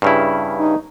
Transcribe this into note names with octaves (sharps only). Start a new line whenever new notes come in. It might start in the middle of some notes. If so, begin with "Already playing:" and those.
G2 C#3 E4
D#4